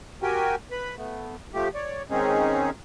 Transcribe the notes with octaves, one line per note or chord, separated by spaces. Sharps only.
F#4 G4 A#4 G5 G#5
B4 B5
A3 B3
F3 A3 G4
C#5 D5
D#3 G#3 C4 C#4 D#4 G#4